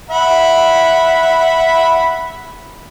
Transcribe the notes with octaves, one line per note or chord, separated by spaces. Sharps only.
E5 F#5 B5